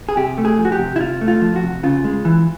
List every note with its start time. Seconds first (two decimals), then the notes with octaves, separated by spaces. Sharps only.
0.09 G#4
0.17 C3 G4
0.38 A3
0.45 G#4
0.59 F3
0.65 F#4
0.72 G4
0.79 C3
0.96 E4
1.00 C3 F4
1.21 A3
1.28 F4
1.42 F3
1.56 F#4
1.63 C3
1.83 C#3 F4
2.04 G#3
2.25 E3